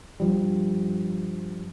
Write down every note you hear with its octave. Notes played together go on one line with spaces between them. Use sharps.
G2 F3 G3